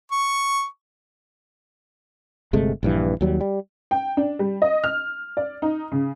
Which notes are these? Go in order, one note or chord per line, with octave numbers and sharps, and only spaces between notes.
C#6
G1 C3 G#3 A3
A#1 G2 E3
D#2 F#3 G3
G3
G5
D4
G3
D#5
F6
D5
D#4
C#3